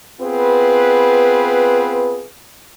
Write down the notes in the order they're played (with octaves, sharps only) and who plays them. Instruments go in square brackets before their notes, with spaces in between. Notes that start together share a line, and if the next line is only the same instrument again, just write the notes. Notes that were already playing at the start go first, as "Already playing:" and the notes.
[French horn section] B3 C4 F4 G#4 B4